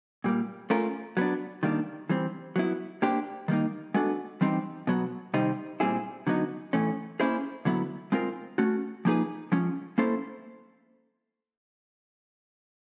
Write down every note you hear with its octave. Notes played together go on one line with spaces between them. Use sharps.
A#2 G3 A#3
A3 C#4 F4 A#4
F#3 B3 D4
D#3 G3 A#3 D4
E3 G3 C4
F#3 B3 E4
A#3 D4 G4 C5
D#3 G3 A#3 D#4
G#3 B3 D4 F#4 A4
E3 G3 C4 D#4 G4
B2 F#3 B3
C3 D#3 G3 C4 D#4
A#2 G3 C4 E4 G#4
D3 F#3 B3 D#4
A2 E3 A3 C#4
A#3 C#4 E4 G#4 C5
D3 F#3 B3 E4
G#3 C4 F4 A#4
A3 C#4 F#4
F3 A#3 D#4 G#4 B4
F3 G#3 C#4
A#3 C#4 E4 A4 C5